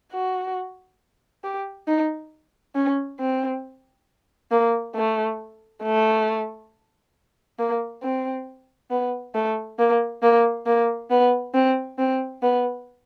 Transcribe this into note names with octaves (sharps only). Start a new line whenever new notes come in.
F#4
G4
D#4
C#4
C4
A#3
A3
A3
A#3
C4
B3
A3
A#3
A#3
A#3
B3
C4
C4
B3